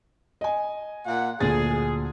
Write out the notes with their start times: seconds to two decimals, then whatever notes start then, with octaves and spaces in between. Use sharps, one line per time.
0.41 D#5 G#5
1.06 A#2 A#3 F#5
1.40 D2 A#2 G#4 A6